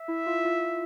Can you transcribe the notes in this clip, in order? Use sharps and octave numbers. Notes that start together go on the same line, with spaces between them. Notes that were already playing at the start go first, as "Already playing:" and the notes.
Already playing: E5
E4
F4
F4